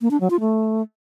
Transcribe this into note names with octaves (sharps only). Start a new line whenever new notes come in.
A#3
D4
F#3
F4
A3